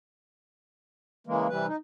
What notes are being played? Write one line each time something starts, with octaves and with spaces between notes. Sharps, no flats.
C#3 E3 G#3 A#3
C3 E3 G3 B4
D#4